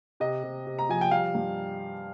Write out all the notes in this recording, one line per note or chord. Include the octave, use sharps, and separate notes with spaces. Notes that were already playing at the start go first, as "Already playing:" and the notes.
C3 D#5
C3
C3
A#5
F3 G#5
G5
G3 F5
G2